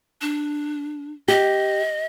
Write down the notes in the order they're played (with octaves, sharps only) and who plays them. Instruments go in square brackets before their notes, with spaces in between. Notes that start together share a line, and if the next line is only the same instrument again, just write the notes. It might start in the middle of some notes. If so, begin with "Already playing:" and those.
[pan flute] D4
[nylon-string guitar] G4 [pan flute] D#5